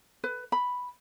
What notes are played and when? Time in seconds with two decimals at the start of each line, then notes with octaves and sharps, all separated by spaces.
0.24 B4
0.52 B5